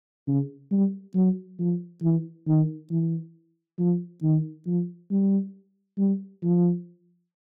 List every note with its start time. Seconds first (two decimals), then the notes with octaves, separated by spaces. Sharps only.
0.28 C#3
0.72 G3
1.15 F#3
1.59 F3
2.03 E3
2.47 D#3
2.91 E3
3.79 F3
4.23 D#3
4.66 F3
5.11 G3
5.98 G3
6.43 F3